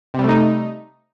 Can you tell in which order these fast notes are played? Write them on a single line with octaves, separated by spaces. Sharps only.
C3 G3 A3 D#4